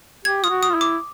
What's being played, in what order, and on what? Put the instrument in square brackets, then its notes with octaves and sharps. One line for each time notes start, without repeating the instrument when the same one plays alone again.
[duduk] G4 [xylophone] G#6
[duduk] F4 [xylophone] D#6
[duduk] F#4
[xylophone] D#6
[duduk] F4
E4
[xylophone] D6